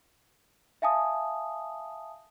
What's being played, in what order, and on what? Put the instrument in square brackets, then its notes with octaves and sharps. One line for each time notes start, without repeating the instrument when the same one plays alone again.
[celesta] E5 F5 G#5 A5 D#6